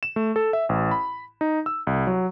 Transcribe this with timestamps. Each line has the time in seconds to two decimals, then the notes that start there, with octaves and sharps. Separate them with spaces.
0.03 E7
0.16 A3
0.36 A4
0.53 E5
0.69 A1
0.91 B5
1.41 D#4
1.66 E6
1.87 C2
2.07 F#3